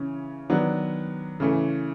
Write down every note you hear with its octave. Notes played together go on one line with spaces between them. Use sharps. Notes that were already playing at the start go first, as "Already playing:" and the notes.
Already playing: C#3 E3 C#4
D#3 F#3 B3 D4
C#3 E3 A3